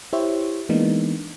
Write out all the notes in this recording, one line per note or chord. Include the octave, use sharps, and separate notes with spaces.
E4 G4 C5 C#5 E5
E3 G#3 A#3 B3 D4 D#4